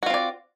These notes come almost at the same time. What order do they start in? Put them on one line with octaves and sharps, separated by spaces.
F#4 F4 C4 D5